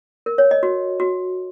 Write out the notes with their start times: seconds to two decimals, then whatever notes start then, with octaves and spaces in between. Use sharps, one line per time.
0.26 A#4
0.38 C#5
0.51 D#5
0.63 F#4
1.00 F#4